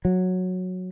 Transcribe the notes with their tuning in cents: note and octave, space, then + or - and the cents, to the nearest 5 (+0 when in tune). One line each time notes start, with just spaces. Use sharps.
F#3 -10